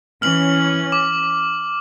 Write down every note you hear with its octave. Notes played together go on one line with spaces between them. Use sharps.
E3 C#4 F6 F#7
D6